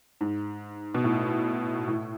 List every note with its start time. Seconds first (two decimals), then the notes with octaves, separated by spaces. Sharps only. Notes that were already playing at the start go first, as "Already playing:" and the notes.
0.21 G#2
0.95 B2
1.04 A2
1.88 A2